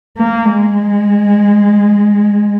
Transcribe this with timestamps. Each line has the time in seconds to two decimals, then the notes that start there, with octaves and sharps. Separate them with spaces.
0.17 A#3
0.45 G#3